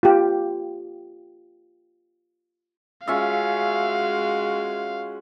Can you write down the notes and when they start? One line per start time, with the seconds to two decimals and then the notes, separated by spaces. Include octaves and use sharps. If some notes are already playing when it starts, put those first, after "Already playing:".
0.03 F4 G4
3.07 G#3 C#4 F4 F#4 E5 F5